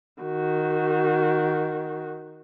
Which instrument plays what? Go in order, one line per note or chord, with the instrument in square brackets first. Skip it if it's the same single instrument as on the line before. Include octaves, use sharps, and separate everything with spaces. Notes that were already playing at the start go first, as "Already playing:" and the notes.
[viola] D#3 F#4